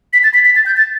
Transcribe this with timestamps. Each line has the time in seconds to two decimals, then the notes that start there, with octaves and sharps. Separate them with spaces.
0.13 B6
0.24 A6
0.34 B6
0.45 B6
0.56 A6
0.66 G6
0.77 A6